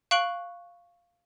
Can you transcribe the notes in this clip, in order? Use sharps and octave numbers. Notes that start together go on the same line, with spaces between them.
F5 C#6 F#6 D7 F#7